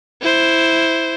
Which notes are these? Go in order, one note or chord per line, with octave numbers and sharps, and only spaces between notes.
E4 C5